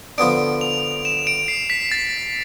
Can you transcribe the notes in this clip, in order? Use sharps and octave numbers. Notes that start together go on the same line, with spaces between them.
D3 F3 B3 D4 D7
F7
E7
D7
C7
B6
A6